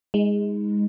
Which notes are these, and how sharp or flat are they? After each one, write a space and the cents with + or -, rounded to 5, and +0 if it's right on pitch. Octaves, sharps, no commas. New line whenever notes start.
G#3 -15 D#4 +25